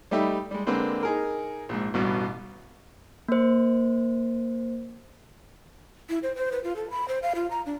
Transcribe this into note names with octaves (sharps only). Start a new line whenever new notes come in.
G3 A3 D#4 G4 E5 B5
G3 G#3
D3 G#3 A#3 C4 B4 C5
D#4 G#4 A#4
A#1 G#2
A1 G2 B2
A#3 C5
E4
C5
C5
B4
F4
A4
B5
C5
F5
F4
A#5
D4